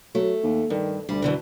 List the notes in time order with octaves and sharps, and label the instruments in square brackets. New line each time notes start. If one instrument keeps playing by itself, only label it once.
[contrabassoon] F#3 [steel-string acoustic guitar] A3
[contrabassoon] D#2
[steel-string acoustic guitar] G2 [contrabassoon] D#3
[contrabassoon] D2 [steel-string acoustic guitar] G3
[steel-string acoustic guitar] F#2 D3 E3